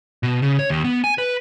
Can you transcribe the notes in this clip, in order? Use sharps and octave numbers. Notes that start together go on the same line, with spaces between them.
B2
C#3
C#5
D#2
B3
G#5
B4